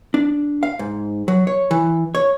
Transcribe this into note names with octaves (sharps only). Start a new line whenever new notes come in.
D4
F5
G#2
F#3
C#5
E3
C#5